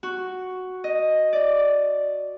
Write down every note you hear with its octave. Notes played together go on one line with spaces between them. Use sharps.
F#4
D#5
D5